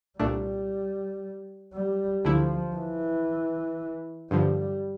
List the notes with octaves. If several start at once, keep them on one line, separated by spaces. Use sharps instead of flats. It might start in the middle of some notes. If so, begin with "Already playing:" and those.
C2 A#2 G3 A3 D4
G3
D2 D3 F3 A3 E4
E3
G2 D3 F3 G3